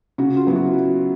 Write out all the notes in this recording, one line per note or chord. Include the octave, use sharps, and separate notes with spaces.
C#3 F#4
F4
F#3 B3 E4
F#4